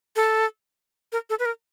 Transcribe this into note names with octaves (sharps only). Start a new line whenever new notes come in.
A4
A#4
A4
B4
A#4